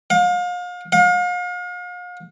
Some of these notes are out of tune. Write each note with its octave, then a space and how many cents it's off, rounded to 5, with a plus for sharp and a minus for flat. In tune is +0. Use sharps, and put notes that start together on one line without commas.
F5 +35
F5 +40